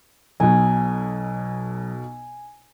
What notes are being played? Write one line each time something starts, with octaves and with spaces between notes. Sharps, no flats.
B1 B2 F#3 G#5